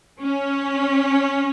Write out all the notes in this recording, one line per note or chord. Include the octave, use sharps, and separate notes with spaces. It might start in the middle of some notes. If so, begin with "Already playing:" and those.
C#4